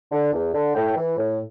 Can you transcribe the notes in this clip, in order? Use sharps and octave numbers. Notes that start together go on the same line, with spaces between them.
D3
E2
D3
A2 G5
E3
A2